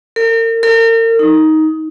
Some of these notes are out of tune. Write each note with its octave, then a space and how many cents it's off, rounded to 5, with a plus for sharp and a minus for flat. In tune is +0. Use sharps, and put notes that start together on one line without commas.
A#4 -40
A#4 -40
D#4 +10